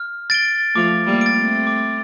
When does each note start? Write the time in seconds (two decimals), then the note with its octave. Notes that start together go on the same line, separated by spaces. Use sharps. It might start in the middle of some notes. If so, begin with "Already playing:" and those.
Already playing: F6
0.30 A6 D7 G7
0.75 F3 A3 D6
1.06 G3 A#3
1.21 A6 D7
1.36 A3 C4
1.67 D6